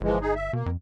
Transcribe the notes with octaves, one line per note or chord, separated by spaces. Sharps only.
G1 E3 F3 G#3
D#4 G#4
E5
B2 A#3
F2